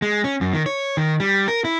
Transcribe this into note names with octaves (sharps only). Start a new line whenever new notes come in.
G#3
C#4
F#2
D#3
C#5
D#3
G3
A#4
E4